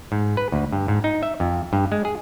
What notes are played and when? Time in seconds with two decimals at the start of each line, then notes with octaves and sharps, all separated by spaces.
0.12 G#2
0.37 B4
0.52 D2
0.72 G2
0.88 G#2
1.04 D#4
1.23 E5
1.40 F2
1.73 G2
1.92 G#3
2.05 G#4